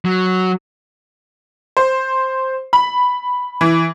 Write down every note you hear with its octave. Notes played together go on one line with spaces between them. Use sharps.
F#3
C5
B5
E3